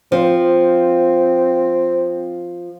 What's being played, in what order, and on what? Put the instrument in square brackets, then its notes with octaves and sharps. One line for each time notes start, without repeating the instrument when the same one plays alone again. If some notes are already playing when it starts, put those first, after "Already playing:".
[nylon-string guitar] F3 [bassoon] C4